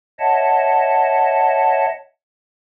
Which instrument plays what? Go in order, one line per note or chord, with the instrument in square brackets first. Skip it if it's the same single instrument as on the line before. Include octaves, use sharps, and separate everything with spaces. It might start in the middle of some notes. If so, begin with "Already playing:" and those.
[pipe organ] C#5 D#5 E5 F#5 A5